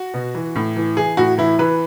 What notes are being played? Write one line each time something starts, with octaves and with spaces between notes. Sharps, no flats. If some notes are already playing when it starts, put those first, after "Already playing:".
Already playing: F#4
B2
E3
A2
E3
E3 G#4
A2 F#4
E3 E4
E3 B4